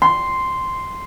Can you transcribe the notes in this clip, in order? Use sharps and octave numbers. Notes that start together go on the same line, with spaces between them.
C6